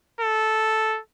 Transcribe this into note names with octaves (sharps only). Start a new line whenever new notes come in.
A4